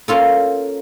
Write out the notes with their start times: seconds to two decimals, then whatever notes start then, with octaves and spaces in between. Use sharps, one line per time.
0.08 A#3 C#4 F4 A4